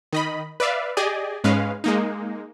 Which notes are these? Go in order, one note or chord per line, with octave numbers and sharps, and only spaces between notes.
D#3 D#5 B5
B4 D5 E5 F5
G4 G#4 D5 D#5 G#5
G#2 G#3 C#4 B4 F5
G#3 A#3 D#4